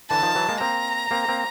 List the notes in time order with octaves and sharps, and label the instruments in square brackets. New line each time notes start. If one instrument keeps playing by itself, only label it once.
[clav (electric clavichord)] D3 E3 [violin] A5
[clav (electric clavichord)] D#3 F3
E3 F#3
G#3 A#3
[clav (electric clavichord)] A#3 C4 [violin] A#5
[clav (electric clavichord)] A#3 C4
A#3 C4